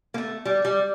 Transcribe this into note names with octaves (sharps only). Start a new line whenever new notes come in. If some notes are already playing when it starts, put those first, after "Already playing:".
A#3
A3
G3
G3